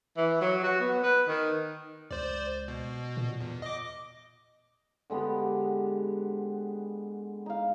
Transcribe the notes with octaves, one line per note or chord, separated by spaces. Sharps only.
E3
F#3
F#4
B3
B4
D#3
C#2 C5 D5
B2
A#2
E2
D#5 D6
D3 G#3 B3 G4
D#4 F5